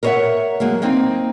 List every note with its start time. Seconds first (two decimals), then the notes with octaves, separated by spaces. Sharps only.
0.03 A#4 C5 C#5 D#5 E5 F#5
0.60 F#3 G#3 A#3
0.82 A#3 C4 D#4